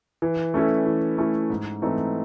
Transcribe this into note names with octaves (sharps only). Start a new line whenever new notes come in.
E3
A3 C#4 E4 A4
E3
A3 C#4 E4 A4
G#2
E3 A3 C4 D#4